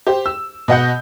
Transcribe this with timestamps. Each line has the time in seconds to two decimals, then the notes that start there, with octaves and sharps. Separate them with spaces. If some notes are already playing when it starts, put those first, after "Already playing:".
0.07 G4 C5
0.26 E6
0.68 B2 D#5 F#5 G6